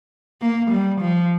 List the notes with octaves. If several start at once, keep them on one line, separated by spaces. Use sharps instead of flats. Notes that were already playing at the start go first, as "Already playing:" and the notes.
A#3
G3
F3